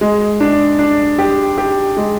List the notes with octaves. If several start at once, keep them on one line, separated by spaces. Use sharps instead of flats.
G#3
D4
D4
G4
G4
G#3